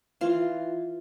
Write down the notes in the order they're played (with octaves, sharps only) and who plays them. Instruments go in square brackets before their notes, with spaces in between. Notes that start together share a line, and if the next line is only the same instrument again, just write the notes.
[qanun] E3 F4